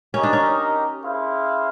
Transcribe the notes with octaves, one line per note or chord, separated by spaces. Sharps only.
C#4 D#4 G4 A#4 D#5
D4
C#4
E4 G#4 C5 F5